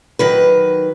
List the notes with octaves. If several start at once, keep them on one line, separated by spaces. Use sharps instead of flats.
D#3 F#3 B4